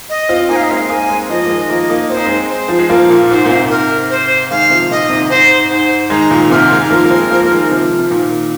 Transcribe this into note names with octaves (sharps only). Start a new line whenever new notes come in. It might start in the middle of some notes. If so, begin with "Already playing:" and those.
D#5
C4 F4
A#3 D#4 G#5
F5
D#5
G#3 C4 F5
A#3 D#4 G#5
G#3 C4
F3 A#3 D#5
A#3
D#3 G#3
F3 A#3 D#5
A#3 D#4
C4 C5
D#4
G#3 C4
C5
F3
G#3
F3 A#3 A#4
A#2
G#2 C5
A#2
G#2 C3
A#4
C5
D#3 G#3 F5
C3 F3
A#2 D#3 D#5
G#2 C3
G#2 C5
G#2 C5
D#3 G#3 A#5
A#2 D#3
G#2 C3 A#4
D#3 G#3
G#3
F3 A#3
A#3
G#3 C4
F3 A#3
A#3
D#3 G#3
C3 F3
C3
A#2 D#3